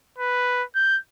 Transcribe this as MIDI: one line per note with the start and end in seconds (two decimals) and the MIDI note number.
0.19 0.64 71
0.75 0.98 91